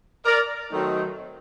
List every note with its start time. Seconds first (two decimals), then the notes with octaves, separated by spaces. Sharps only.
0.26 A#4 D5
0.72 D#3 F#3 A3 C4 D#4